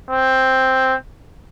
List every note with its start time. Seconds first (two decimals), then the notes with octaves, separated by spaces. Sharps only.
0.11 C4